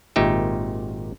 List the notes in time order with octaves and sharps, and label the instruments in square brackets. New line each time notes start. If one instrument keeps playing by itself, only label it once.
[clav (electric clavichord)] G#1 A#2 D#4 G4 E5